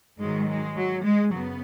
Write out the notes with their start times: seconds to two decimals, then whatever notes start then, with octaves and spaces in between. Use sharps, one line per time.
0.19 G#2 D#3 F#3 G#3
0.48 G#3
0.76 F#3
1.04 G#3
1.31 F#2 C#3 F#3 B3